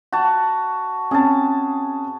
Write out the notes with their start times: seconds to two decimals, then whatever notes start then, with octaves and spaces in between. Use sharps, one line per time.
0.12 F#4 A5
1.11 C4 C#4 G#4 A5